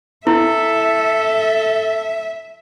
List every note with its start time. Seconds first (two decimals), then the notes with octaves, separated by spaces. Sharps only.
0.27 E4 A4 E5